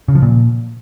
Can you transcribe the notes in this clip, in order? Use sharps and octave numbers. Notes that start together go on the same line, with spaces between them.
C#3
F3
A#2